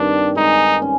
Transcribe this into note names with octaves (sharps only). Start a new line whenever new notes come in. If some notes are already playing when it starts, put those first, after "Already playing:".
Already playing: G2 D#3 C4 D4
G#3 D#4
C#4